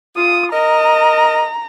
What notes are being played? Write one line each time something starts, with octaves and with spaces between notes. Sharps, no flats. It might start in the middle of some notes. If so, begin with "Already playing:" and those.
F4 D#6
A#4 D#5 A#5